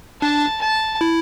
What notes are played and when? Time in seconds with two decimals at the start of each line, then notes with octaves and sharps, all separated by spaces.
0.21 D4 A5
0.61 A5
1.01 E4